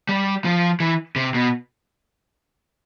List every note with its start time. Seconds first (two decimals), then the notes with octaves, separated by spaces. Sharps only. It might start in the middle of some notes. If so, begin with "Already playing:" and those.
0.09 G3
0.45 F3
0.80 E3
1.16 C3
1.34 B2